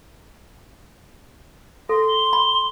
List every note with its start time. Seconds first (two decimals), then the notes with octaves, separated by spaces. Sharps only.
1.89 A4 C6 A#6
2.08 G7
2.33 B5